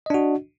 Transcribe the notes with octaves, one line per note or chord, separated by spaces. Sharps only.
D4 F#4 D#5